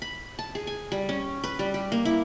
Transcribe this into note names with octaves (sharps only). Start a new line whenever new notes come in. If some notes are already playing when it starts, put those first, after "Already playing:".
B5
A5
G#4
G#5
G3
C#4
B4
G3
G4
A#3
E4